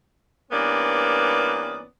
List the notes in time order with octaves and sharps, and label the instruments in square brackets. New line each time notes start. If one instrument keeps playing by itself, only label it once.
[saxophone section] G2 E3 A#3 B3 C#4 D5